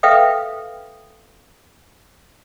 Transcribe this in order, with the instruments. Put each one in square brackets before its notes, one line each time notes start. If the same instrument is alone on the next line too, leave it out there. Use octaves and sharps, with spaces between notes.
[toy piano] A4 B4 E5 F5 G5 D#6